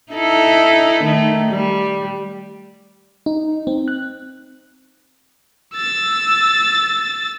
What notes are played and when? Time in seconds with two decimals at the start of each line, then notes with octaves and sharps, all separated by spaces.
0.12 D#4 E4 A4
1.04 D#3 A3
1.52 G3
3.26 D#4
3.67 C4
3.88 F#6
5.75 E6 A6